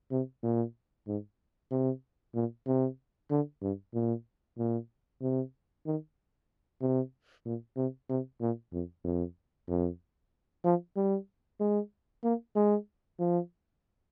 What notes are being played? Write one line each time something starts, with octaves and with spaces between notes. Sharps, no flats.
C3
A#2
G#2
C3
A#2
C3
D3
G2
A#2
A#2
C3
D#3
C3
A#2
C3
C3
A#2
F2
F2
F2
F3
G3
G#3
A#3
G#3
F3